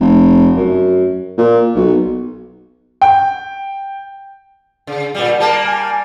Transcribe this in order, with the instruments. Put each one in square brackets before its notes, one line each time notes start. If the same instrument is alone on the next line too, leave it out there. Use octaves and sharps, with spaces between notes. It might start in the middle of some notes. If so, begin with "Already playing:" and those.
[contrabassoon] F1
F#2
A#2
B1
[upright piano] G5
[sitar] C#3
A#2 G3
[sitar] G3 A#3 [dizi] A5
[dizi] G#5